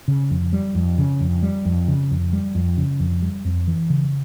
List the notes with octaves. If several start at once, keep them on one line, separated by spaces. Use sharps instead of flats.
C#3
F2
G3
F2
C#3
F2
G3
F2
C#3
F2
G3
F2
C#3
F2
G3
F2
E3
C#3